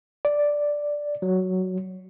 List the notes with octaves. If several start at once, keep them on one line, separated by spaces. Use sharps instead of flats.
D5
F#3